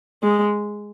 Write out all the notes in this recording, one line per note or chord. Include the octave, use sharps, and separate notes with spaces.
G#3